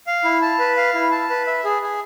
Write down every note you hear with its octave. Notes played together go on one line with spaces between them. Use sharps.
F5
E4
A5
B4
F5
E4
A5
B4
E5
G#4
G#4